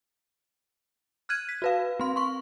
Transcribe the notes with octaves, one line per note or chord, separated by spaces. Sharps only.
F6 F#6 G#6 D#7
B6
F#4 B4 F5
C4 C6
C6 C#6